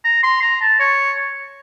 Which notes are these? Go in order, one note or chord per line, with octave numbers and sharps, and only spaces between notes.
A#5
C6
A#5
A5
C#5